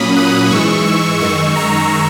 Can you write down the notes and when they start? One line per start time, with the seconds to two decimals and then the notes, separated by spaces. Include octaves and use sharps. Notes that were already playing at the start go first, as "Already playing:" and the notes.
Already playing: A#2 F#3 A#3 C#4 B5 D#6
0.15 D#6 F#6
0.50 G#2 E3 G#3 C#6 E6
0.85 C#6 E6
1.20 F#2 D#3 G#3 C#6 E6
1.56 A#5 C#6